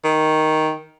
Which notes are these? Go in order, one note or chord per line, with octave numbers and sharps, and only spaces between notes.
D#3